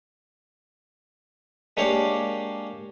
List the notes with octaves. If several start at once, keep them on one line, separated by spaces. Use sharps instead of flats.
G#3 A#3 D4 G4 C#5 F5